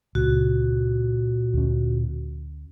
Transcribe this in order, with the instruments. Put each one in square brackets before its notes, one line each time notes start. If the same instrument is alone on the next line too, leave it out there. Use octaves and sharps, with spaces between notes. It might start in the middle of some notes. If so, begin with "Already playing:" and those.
[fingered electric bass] C#2 [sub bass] A#2 [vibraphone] F#4
[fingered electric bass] D2 C#4